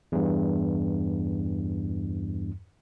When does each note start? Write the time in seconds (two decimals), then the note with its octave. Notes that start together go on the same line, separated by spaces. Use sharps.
0.12 E2 G2